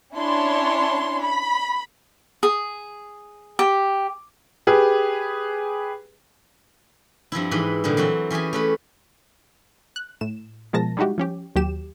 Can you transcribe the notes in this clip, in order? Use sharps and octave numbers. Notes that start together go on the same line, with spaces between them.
C#4 D4 E4 C#5 A5 C6
B5
G#4
G4
G4 G#4 B4
G2 F3 C4 E4
G#2 E3 B4 G5
A#2 D3 G3 G#3
E3 F#3 C4 F#4
E3 C#4 G4 G#4 G#5
A3 C#4 B4
F#6
A2 E7
B2 F3 G#3 A#4 A5 A#6
G3 G#3 D#4 E4 F#4 G4
F3 C#4 G4
D#2 F#3 G4 E7